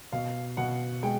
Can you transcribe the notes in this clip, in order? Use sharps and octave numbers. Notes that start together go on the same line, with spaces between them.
B2 F5
B2 F#5
G#3 G5